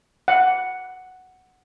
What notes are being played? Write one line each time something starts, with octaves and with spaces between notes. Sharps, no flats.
F#5